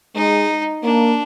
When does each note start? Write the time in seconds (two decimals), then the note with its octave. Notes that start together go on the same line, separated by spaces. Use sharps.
0.15 G#3 D#4
0.83 A#3 D4